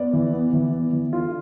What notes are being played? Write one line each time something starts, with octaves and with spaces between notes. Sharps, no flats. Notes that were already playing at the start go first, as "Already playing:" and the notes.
Already playing: B3 D5
E3
B3
E3
B3
E3
D3 F4